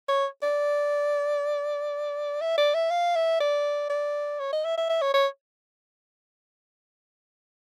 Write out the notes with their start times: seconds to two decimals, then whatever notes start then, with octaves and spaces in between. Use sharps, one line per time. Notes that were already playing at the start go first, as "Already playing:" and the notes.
0.08 C#5
0.43 D5
2.41 E5
2.58 D5
2.74 E5
2.90 F5
3.16 E5
3.40 D5
3.90 D5
4.40 C#5
4.52 D#5
4.65 E5
4.77 E5
4.90 E5
5.02 C#5
5.14 C#5